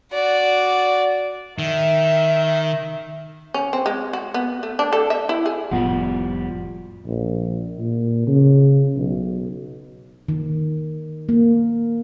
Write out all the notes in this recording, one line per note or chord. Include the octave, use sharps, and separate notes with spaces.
F#4 D5
D#3 E5
C#4
C4
G#3
F#4
B3
A3
D4
A4
E5
E4
G#4
F1 A2 F3 G3 B3 F4 F#5
A#1
A#2
C#3
B1
D#3
A#3